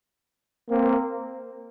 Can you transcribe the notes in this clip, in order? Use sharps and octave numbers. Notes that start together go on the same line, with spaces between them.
A#3 C4